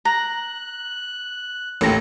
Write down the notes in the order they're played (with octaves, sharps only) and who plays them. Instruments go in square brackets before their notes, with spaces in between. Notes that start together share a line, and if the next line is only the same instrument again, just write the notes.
[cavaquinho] A#5 [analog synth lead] F#6
[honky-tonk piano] A1 D#2 [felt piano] A3 A#6